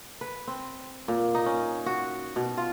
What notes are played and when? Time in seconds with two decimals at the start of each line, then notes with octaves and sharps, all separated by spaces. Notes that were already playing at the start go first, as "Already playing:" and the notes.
0.21 B4
0.47 C4
1.08 A#2
1.35 D#4
1.46 C#4
1.86 F#4
2.36 B2
2.57 F4